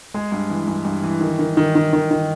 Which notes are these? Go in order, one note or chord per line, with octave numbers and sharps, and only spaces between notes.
G#3
G2
E3
G2
G2
E3
D#3
D#3
D#3
D#3
D#3
D#3